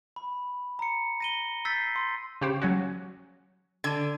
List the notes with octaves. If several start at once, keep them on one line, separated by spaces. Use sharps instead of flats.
B5
A#5 C#7
A#6 D#7 G7
E6 G6 A6 B6 C7
C6
C#3 G4 C5
F#3 C#4 F#4
D3 G#6 D#7